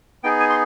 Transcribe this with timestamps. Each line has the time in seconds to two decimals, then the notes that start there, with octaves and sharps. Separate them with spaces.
0.24 B3 D#4 G#4 G5
0.40 G#5
0.49 C6